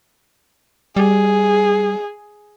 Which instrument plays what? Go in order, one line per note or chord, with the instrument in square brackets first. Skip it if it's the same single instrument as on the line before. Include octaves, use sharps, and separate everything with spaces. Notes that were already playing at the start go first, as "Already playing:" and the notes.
[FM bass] G3 [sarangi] G#4